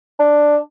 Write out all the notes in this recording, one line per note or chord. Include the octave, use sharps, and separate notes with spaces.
D4